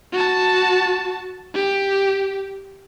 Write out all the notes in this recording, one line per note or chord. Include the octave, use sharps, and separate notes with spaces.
F#4 A5
G4